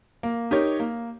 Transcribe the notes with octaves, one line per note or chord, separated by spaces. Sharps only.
A#3
D#4 G4 A#4 C#5
A#3